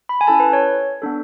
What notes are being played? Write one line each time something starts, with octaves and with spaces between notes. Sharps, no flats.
B5
G#5
C#4 E4 A4 A5
B4
C#5
B3 D4 A4